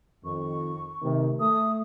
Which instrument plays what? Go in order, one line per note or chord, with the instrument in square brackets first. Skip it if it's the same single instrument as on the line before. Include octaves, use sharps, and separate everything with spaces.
[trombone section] F2 D#3 [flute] C#6
[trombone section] C3 D#3 A3
[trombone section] A3 [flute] D#6